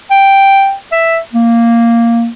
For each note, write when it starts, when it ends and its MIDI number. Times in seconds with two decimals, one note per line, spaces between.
0.11 0.74 79
0.92 1.18 76
1.33 2.29 58